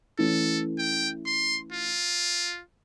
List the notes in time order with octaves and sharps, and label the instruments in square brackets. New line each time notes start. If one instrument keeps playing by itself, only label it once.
[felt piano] E3 A3 C#4 [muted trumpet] A4
[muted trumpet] G5
C6
F4